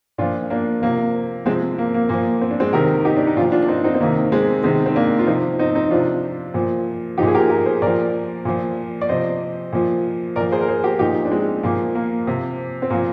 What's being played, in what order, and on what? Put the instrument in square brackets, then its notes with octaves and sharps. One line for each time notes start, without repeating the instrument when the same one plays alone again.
[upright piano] A#2 F3 D4 F4
A#3 D4
C3 F3 A#3
C3 F3 G#3 C4
A#3
A#3
A#2 F3 A#3
C4
D4
G#3 C4
C3 D#3 G4 A#4
D#4 G4
D4
D#4
A#2 D4 F4
F3
D4 F4
D4
C4 D#4
C4 D#4
C4
C3 D#3 A#3
G#3 C4
C3 D#3 G#3 C4
C4
A#3 D4
F4
C3 F3 C4 D#4
C4 D#4
C4 D#4
C3 F3 D4 F4
A#2 F3
F3 D#4 G4
A#2 G#4
G4 A#4
G4 A#4
G#4 C5
A#2 F3 A#4 D5
A#2 F3
D5
C3 F3 C5 D#5
A#2 F3
A#2 F3 A#4 D5
G#4 C5
A#4
G#4 C5
G4 A#4
A#2 F3 D#4 G4
D4
G#3 C4
A#2 F3 A#3
A#3
C3 F3
C4
A#2 F3 A#3